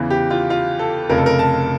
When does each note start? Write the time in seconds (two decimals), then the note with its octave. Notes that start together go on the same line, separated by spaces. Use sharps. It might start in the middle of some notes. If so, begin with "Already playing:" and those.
Already playing: E2 C#3 E3
0.10 G4
0.30 F4
0.50 F4
0.79 A4
1.09 F1 F2 C#3 A#4
1.18 A4
1.26 A#4
1.39 A5